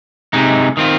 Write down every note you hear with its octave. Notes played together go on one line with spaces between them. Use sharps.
C3 G#3 D#4
D#3 C4 F4